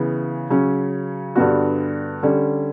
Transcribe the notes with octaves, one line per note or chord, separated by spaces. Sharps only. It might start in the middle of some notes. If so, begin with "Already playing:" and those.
Already playing: C#3 E3 B3
C#3 F#3 C#4
G2 D3 G3 B3 F#4
D3 G3 C#4